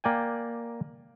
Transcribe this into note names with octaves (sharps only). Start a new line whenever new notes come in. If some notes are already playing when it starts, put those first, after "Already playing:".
A#3 D5 G5 G#5